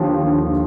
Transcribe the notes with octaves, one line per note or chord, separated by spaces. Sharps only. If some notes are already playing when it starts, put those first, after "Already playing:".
Already playing: D#2 D3 F3